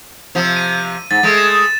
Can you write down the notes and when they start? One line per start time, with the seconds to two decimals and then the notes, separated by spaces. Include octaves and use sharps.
0.35 C3 F3
0.56 D#7
1.11 G#2 A6
1.23 G#3 A3
1.38 E7